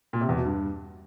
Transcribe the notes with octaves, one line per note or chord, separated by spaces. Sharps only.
A#2
C3
E2
B2
G2